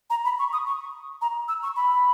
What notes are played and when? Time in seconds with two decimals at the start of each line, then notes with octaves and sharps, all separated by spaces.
0.10 A#5
0.25 B5
0.39 C#6
0.53 D#6
0.66 C#6
1.21 A#5
1.48 E6
1.63 C#6
1.76 B5